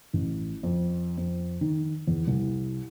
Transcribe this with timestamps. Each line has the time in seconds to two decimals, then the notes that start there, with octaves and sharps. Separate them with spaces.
0.13 A1
0.63 F2
1.17 F2
1.61 D#3
2.07 E2
2.27 C2